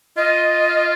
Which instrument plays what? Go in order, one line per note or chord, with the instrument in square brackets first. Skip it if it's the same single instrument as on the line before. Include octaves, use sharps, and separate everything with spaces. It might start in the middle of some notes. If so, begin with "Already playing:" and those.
[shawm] F4 [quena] D#5